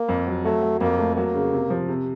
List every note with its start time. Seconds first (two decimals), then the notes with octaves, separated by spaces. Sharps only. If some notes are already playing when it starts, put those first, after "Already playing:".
Already playing: A#3
0.08 F2
0.27 F#3
0.45 F#3 A3
0.62 F#3
0.81 F2 A#3
0.98 A3
1.16 F#3 A#3
1.34 C#3
1.53 C3
1.70 F3
1.88 C3